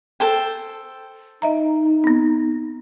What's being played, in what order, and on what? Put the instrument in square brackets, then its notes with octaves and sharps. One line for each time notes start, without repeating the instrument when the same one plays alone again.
[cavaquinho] A4 C5 G5
[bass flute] D#4 [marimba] D#5 E5 A#5
[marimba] B3 C4